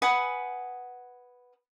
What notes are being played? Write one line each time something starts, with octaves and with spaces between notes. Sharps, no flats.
B4 F#5 G#5 D#6